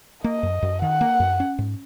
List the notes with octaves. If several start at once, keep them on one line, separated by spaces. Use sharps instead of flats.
A#3 D#5
F#2
F#2
D#3 F#5
A#3
F#2
C#4
G#2